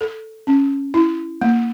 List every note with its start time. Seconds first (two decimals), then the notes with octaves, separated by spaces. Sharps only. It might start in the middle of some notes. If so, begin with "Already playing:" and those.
0.01 A4
0.47 C#4
0.94 E4
1.41 A#3